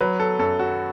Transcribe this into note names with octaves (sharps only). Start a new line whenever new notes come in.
F#3 B4
A4
F#2 A4
F#4